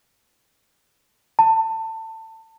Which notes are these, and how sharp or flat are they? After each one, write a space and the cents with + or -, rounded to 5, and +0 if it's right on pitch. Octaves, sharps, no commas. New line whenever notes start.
A5 +25